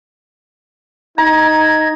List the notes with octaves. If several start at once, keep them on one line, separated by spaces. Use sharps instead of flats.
D#4 A#5 G#6